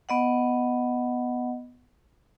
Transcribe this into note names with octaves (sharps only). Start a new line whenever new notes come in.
B3 D#5 F#5